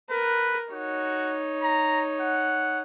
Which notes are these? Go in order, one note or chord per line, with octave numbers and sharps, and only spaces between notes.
A#4 B4
D#4 F#4 C#5
A#5
F#5